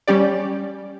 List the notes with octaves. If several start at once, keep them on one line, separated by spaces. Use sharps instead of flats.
G3 C#4 G4 D5